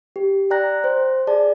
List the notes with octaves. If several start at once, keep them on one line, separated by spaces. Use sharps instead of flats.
G4
D5 G5 A#5 F#6 A#6
C5
G#4 D5 A5